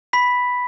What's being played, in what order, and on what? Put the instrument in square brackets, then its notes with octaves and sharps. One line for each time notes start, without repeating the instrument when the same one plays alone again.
[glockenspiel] B5 B6